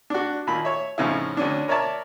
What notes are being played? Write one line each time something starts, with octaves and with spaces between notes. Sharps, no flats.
D4 F#4
D#2 A#2 B5
C#5 E5
F2 A2 C#3 F3 D#4 E4
D2 C#4 D4
A#4 C#5 D5 E5 A5